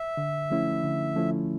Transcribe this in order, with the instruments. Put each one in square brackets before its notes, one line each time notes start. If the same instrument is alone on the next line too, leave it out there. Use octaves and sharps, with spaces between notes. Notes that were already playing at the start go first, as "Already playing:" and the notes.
Already playing: [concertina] E5
[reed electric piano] D3
F3 A3 C#4 E4
D3
F3 A3 C#4 E4